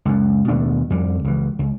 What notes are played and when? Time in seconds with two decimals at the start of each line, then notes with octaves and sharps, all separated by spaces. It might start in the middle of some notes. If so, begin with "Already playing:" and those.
0.05 C#2 F#2
0.48 D#2 B2 A3 D4
0.90 F2 G3
1.24 C#2 E3
1.59 C#2